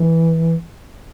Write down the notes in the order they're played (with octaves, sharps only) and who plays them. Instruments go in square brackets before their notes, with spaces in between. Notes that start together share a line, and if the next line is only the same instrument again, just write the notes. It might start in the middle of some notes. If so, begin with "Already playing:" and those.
Already playing: [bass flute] E3